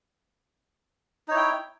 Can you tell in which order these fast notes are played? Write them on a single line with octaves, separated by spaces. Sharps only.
D#4 C#5 E4 G5